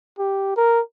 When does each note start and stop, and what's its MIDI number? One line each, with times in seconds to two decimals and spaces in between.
0.19 0.52 67
0.57 0.81 70